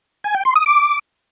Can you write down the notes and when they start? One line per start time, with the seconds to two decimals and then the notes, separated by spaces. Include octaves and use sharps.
0.24 G#5
0.35 G5
0.45 C6
0.56 D#6
0.66 D6